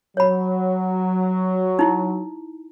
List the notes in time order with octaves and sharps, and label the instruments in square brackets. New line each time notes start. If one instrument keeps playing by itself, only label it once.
[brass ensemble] F#3 [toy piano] C#5 B5
[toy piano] D#4 E4